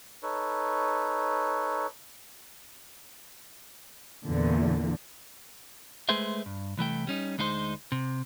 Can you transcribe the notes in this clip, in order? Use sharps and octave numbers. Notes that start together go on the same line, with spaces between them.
D#4 A4 B4 C#5
E2 A#2 D3
G#3 A3 G#4 B4 C5 E5
G2
C2 E3 A3 G5
G3 C#4 D#4
D2 G#3 D#4 G4 C5
C3